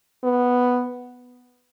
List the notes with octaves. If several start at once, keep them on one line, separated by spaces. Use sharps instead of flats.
B3